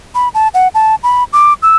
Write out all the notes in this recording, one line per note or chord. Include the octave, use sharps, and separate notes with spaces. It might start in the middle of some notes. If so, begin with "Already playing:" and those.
B5
A5
F#5
A5
B5
D6
E6